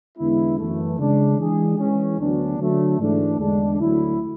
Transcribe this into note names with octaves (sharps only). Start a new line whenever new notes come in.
E2 D3 G#3 B3 E4
F#2 E3 A3
C#3 G#3 D4
E3 G#3 D4 G#4
E3 G#3 C#4
D2 D3 F#3 B3 D4
D3 F#3 A3
G#2 E3 A3 D4
E2 D3 G#3 D4
D2 D3 F#3 A3 E4